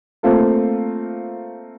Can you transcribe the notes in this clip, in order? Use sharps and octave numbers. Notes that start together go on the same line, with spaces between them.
A3 A#3 C4 F4 A4